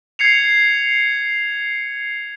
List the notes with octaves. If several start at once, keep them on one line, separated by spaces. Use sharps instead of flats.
G#6 C7 C#7 F7